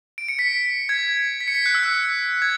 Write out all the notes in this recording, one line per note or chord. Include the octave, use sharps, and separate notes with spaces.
D7
C#7
B6
G#6
B6
C#7
B6
F#6
E6
F#6
G#6